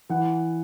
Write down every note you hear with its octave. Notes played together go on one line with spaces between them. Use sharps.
E3 F#5